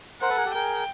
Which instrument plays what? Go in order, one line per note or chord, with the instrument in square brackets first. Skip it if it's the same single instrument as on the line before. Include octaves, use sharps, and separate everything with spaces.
[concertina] A#4 C5 [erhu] F#5
[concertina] A4 B4
G#4 A#4
G4 A4
[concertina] G#4 A#4 [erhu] G5